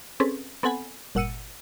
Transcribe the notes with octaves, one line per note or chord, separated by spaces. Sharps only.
C4 C#4 G#4 A4 B4
B3 C4 A4 F#5 G#5 B5
G1 A#2 F#5 E6 C#7 D#7